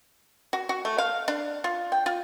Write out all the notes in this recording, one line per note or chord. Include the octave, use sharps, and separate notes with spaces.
F#4
F#4
A3
F5
D4
F4
G5
F4